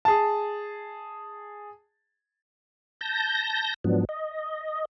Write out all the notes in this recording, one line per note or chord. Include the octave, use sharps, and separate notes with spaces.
G#4 A5
A5 G6 A#6
G#2 F3 F#3 B3 D4
D#5